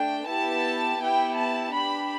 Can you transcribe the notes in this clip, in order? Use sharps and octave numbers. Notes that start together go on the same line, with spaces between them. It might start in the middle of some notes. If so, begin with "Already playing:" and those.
Already playing: A3 D4 G5
B3 E4 G4 A5
B3 E4 G4 G5
A5
D4 G4 B5